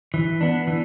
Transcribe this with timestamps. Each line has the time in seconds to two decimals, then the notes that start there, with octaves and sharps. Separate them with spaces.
0.14 E3
0.41 B3 D4
0.67 E3